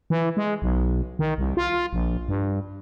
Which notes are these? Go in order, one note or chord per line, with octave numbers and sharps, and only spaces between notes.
E3
G#3
B1
D#3
C2
F4
A#1
G2